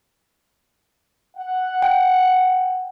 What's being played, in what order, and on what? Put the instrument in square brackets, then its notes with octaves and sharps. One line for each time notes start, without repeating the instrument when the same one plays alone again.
[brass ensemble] F#5
[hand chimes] G5